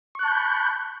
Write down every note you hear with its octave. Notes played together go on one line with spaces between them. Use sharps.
A5 B5 C#6 F#6 G6